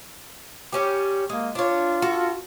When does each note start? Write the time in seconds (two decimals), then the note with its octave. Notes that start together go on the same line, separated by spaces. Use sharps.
0.72 G3 C#4 G4
1.29 G#3 A#3
1.55 D4 F4 C#5
2.02 F#4 A4